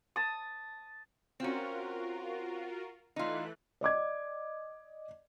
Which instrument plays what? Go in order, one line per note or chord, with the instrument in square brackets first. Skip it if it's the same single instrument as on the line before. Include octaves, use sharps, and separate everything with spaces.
[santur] A5 D#6
[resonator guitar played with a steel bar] C4 C#4 [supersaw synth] F4 F#4 A#4
[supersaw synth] E3 A3 F#6 [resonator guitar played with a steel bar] D#4 F4
[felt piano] D5 D#5 D6 G#6